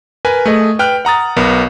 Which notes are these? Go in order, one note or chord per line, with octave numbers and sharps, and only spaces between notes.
A#4 B4 G#5
A3 G#4 D#5
B4 G5 F6 F#6
F#5 A#5 D#6 A6
B1 B3 A#4